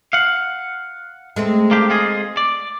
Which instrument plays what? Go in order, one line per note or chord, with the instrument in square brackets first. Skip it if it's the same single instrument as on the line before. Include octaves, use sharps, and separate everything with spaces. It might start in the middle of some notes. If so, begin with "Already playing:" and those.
[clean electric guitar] F5 F#5
[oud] G#3 A3 C4
[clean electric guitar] A#3 D4 G4
F4 G#4 D#5
D5